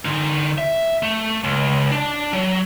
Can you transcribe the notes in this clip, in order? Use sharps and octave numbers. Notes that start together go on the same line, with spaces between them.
D3 D#4
E5
A3
C#2
D4 A5
F#3